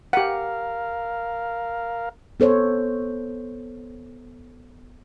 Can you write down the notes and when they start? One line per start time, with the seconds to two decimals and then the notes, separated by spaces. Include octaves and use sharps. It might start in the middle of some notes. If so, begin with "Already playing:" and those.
0.13 G4 A#4 F5 F#5
2.40 B3 A4 C5 C#5